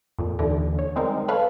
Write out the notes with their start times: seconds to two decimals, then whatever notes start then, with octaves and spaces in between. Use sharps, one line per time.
0.18 F2 A#2
0.39 D#2 D3 E3
0.79 C#5
0.96 G3 G#3 C4 D#4 A#4
1.28 A4 B4 C#5 F5